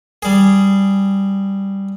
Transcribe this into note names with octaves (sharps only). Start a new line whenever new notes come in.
G3 G#4